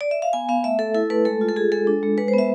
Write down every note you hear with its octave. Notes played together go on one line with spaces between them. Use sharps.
D5
E5
F5
B3 G#5
B3 F5
A3 E5
A3 A4
E4 A4
A3 B4
G#3 A4
F4
A4
F4 G#4
G#3 A4
D4
G#3
G#3 B4
C5
B3 E5